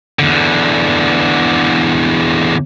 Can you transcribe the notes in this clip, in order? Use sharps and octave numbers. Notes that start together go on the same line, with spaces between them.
E2 D3